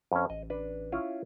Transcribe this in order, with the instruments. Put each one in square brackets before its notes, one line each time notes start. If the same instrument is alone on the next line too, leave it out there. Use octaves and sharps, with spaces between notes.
[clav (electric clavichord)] F2 C#4
[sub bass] A1 [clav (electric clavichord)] D#5
[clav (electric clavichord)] D4 B4
C#4 E4 F4